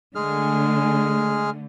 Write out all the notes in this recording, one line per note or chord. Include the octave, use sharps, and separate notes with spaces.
D3 G#3 A3 G#4 F6